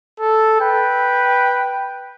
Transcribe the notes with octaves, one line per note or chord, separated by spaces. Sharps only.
A4
B4 G5